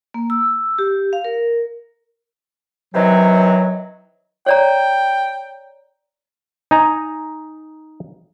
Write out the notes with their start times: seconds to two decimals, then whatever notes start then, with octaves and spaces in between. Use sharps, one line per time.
0.14 A#3
0.30 E6
0.79 G4
1.13 F5
1.25 A#4
2.94 C3 D#3 E3 F#3
4.46 C#5 D5 G5 A#5
6.71 D#4 G#5 A#5